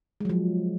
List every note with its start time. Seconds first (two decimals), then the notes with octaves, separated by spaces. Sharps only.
0.21 G#3
0.25 F#3
0.29 F3